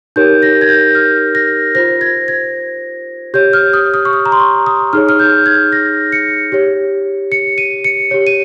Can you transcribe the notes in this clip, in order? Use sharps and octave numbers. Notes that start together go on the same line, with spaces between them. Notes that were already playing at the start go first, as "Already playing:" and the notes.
D#4 G4 A#4 C#5 G6
A#6
G#6
G6
F6
A#6
F4 C5 A#6
G#6
G#6
G4 C#5 G6
F6
D#6
D#6
C#6
D#6
A#5
C6
C#6
D#6
D#4 G#4 C#5 F6
F6
G6
G#6
A#6
C#7
G4 C#5
C#7
D#7
C#7
G4 C#5
D#7